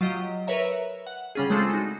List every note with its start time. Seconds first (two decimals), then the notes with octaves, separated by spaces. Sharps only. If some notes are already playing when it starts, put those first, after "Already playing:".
0.01 F#3 F4 G4 D#5
0.47 A#4 B4 C#5 E5 A#5
1.07 F#5
1.35 C#3 G3 C#4 F4 G#4
1.50 G#3 A3 C4 D4 F4 A4
1.73 D#4 F#4